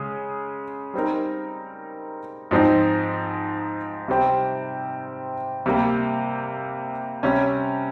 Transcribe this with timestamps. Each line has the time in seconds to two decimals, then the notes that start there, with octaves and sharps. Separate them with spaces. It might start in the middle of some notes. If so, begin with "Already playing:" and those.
Already playing: C#3 G#3 G#4
0.94 G3 C4 D#4 A#4
2.51 G#2 F3 C4 D#4
4.08 C3 G3 C4 G4
5.66 C3 G3 A#3
7.23 C3 G3 C#4